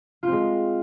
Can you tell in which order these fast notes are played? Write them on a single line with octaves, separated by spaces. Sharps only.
F4 C4 G#3